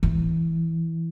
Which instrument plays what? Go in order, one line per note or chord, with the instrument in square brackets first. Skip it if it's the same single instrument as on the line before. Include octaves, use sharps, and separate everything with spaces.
[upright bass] E3